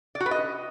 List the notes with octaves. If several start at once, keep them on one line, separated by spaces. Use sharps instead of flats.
D5
F#4
B4
D#5